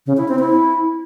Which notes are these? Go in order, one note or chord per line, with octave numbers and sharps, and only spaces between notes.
C#3
E4
C4
E4